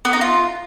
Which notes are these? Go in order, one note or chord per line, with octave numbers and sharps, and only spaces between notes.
B3
D#4
F4